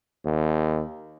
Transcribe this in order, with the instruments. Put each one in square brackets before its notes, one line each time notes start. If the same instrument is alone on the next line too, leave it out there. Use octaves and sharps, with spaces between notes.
[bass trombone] D#2